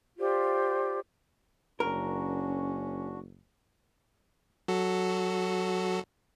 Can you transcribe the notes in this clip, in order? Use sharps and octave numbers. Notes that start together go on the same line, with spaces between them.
F4 G4 C5 D5
F#1 C#4 D4 F#4 A#4
F#3 F#4 A4